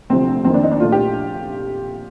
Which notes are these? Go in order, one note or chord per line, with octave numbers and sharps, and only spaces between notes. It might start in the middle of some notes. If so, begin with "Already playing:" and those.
D2 C3 F3 C4
F2 D#3 A#3 C4
D4
D#4
D4
A#1 A#2 A3 F4
G4